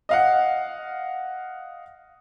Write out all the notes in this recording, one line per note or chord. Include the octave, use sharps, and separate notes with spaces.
D#5 F5 F#5